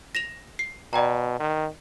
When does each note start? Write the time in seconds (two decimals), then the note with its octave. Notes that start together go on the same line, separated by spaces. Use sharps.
0.15 A#6 E7 F7
0.59 C7
0.93 B2 D5 G5 A#5
1.39 D#3